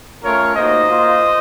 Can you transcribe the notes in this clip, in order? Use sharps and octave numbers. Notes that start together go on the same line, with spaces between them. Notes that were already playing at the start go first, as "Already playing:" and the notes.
A3 C#4 F4 A#4 C#5
A#3 D#4 F#4 C5 D#5
A#3 F4